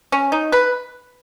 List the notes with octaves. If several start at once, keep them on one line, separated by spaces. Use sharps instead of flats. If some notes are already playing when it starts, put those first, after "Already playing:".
C#4
D#4
B4